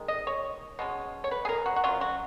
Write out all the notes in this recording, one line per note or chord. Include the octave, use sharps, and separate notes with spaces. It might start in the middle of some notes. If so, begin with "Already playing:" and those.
Already playing: D#3 G#3
D#5
C#5
B2 G#3 C#4
C#5
B4
G#4
A#4
F#4
F#4
F#3 C#4 F4
F#4